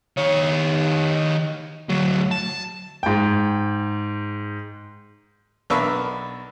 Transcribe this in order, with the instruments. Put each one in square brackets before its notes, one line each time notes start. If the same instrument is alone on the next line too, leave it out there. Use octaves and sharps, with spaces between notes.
[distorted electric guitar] D#3 C#5
D2 F#3
A5
[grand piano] G#2 G5
[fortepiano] B1 D4 A#4 B4 E5 C#6